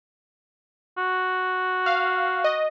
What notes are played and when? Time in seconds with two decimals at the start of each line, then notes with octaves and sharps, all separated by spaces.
0.98 F#4
1.86 F5
2.44 D#5